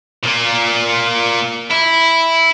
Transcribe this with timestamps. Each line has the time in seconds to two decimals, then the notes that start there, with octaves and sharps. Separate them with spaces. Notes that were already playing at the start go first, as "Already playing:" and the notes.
0.23 A#2 A#3
1.71 E4